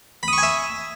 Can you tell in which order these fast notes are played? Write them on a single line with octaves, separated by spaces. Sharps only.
B5 D#6 C#6 G#5 E5